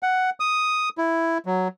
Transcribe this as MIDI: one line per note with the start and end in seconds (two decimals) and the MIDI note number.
0.03 0.30 78
0.40 0.89 87
0.98 1.38 64
1.46 1.68 54